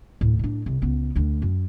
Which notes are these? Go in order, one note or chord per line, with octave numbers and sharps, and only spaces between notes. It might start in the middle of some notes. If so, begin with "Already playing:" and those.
D2 A2
A2 D4
C2
C#2 B3
D2 D3
F#2